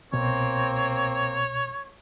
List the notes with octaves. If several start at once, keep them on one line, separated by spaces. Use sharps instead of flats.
C2 B2 A#3 C4 C#5